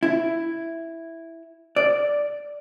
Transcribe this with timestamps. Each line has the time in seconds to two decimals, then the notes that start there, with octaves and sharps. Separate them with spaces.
0.03 E4
1.76 D5